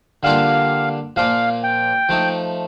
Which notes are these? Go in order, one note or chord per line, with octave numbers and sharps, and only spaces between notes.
D3 G3 A#3 D4 F4 F5
A#2 F3 A#3 F4 F5
G5
F3 A3 D#4